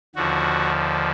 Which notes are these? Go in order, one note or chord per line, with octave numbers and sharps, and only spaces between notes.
D#2 D3 F3 F#4